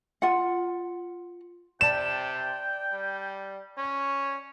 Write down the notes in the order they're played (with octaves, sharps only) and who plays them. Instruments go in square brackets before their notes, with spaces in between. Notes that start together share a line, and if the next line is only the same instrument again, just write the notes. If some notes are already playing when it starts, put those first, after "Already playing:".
[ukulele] F4 F#5
[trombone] C3 [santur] D5 A5 B5 [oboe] G5 [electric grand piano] E7
[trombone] G3
[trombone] C#4 [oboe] C#5